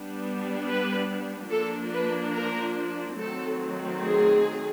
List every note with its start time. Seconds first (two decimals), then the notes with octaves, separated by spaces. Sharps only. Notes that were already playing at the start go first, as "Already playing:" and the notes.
Already playing: G3 B3 D4
0.67 B4
1.50 F3 A#3 D4 A4
1.93 B4
2.35 A#4
3.19 D#3 F#3 A3 C4 A4
4.03 G#4